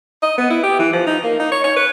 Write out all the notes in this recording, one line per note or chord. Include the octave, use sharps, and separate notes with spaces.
D#5
B3
E4
G4
E3
F3
D#4
A#3
D#4
C#5
C#5
B4